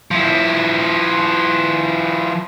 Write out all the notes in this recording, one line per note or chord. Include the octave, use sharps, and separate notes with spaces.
F3 E4